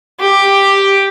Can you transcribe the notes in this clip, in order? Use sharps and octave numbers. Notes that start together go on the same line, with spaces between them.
G4